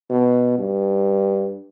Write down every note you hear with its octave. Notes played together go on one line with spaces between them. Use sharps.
B2
G2